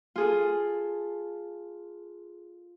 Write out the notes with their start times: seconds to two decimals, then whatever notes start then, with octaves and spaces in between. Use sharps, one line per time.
0.16 F4 G#4 A4